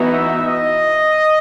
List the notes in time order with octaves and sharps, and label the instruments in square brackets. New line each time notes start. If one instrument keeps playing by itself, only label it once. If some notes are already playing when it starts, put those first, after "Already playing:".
Already playing: [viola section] E3 B3 D#4 F#4
[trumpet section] E5
D#5